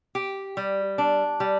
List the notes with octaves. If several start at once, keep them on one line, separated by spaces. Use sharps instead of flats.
G4
G3
D4
G3